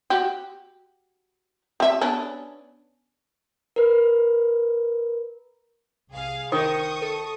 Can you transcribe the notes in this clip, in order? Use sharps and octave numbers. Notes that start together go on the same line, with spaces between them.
F#4 G4
C4 E5
B3 C#4 D4
A#4 B4
C2 G#4 F5
D#3 C5 D#5 C#6 D#6
A4